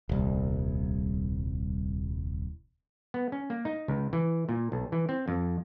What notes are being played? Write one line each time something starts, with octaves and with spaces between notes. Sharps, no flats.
D#1 C2
B3
C#4
A#3
D#4
C#2
E3
A#2
B1
E3
C4
F2